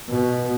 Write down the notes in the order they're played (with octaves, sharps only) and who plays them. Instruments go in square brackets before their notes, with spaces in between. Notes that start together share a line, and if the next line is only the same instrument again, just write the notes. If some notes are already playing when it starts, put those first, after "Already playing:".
[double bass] B2